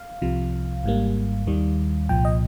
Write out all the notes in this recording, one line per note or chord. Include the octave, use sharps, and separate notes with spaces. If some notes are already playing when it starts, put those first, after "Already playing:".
Already playing: F5
C2 C3 F3
G#1 G#2 G3 A#3
D#2 D#3 G3
C2 A#2 F3 G5
D#5